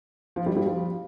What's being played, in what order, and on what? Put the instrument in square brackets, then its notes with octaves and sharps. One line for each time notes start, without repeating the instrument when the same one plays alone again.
[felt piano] F3
G3
G3
F3